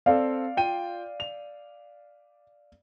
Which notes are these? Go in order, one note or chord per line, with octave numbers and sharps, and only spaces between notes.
C4 A4 D5 F5
F4 G5 D#7
F7